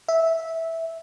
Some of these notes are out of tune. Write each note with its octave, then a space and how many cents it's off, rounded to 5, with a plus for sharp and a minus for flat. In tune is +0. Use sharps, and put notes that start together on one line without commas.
E5 -10